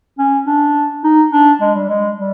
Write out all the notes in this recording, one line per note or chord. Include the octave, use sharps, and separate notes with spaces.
C#4
D4
D#4
D4
G#3
G3
G#3
G3